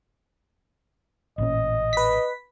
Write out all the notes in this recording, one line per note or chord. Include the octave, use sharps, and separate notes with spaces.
A1 A#2 C#4 D#5
B4 B6